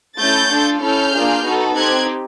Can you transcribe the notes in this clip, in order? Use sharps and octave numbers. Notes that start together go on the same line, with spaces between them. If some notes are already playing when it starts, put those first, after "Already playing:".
A3 C#4 E4 A4 G6 A6
D4 F4 A4
C#4 E4 A4 F6 G6
A#3 D4 F4 G#4
B3 D#4 F#4 A4
C4 D#4 G4 F#6 G#6